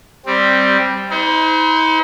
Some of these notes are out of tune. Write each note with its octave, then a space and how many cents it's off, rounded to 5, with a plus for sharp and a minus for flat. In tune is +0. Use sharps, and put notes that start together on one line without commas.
G3 +0 C4 +0
D#4 +45 C5 -35